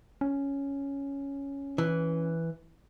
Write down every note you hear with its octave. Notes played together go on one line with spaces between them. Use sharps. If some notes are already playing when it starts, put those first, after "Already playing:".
C#4
E3